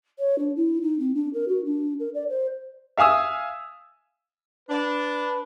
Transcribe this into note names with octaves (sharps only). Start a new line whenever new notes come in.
C#5
D4
E4
D#4
C4
D4
A#4
F#4
D4
A#4
D5
C5
E5 F5 G#5 D#6 E6
D4 B4